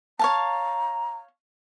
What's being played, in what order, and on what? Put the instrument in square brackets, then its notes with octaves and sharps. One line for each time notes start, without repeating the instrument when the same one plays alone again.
[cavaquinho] C#5 F5 A5 [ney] A#5